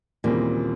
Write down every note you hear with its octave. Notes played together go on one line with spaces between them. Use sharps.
D#2 A#2 C#3 E3 G3 C4